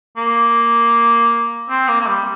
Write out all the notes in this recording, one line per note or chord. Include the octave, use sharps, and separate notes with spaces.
A#3
C4
A#3
A#3
G3